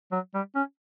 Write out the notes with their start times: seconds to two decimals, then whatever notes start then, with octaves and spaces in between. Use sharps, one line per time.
0.12 F#3
0.34 G3
0.55 C#4